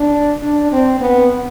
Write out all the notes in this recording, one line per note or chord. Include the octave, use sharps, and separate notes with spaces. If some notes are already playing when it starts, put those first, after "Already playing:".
Already playing: D4
D4
C4
B3